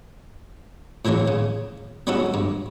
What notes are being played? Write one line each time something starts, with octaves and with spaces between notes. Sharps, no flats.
A2 E3 G#3 A#3 C#4
C#3
G3 G#3 C#4 D#4 F#4 A4
G2